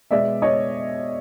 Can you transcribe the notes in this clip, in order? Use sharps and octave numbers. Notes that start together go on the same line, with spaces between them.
B2 G#3 B3 D5 E5
C#5 D#5